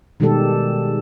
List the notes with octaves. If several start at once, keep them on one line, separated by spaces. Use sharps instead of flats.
B2 D#3 G3 G#3 G4 A4